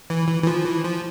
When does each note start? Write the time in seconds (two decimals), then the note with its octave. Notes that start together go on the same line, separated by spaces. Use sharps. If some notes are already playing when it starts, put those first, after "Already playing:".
0.10 E3
0.28 E3
0.43 E3
0.47 F3
0.65 E3
0.84 F3